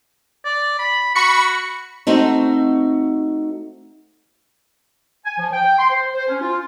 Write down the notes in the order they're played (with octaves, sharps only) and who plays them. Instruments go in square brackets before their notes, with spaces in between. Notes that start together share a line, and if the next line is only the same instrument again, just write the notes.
[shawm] D5
B5
[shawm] F#4 [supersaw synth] B5 C#6 C#7
[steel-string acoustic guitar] A3 C4 D#4 F#4
[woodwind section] G#5
F3
G5
C6
C5
C5
C#4
F4